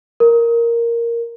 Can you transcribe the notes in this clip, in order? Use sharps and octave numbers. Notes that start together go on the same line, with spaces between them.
A#4